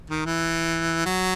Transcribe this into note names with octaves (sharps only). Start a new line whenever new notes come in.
D#3
E3
F#3